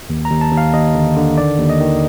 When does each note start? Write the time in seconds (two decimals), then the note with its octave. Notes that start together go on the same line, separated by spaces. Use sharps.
0.10 D#2
0.25 A#5
0.31 D#2
0.41 A5
0.52 D#2
0.57 F5
0.74 D#2 D#5
0.95 D3
1.16 D3
1.37 D#3 D5
1.59 D#2
1.70 D#5
1.81 D#3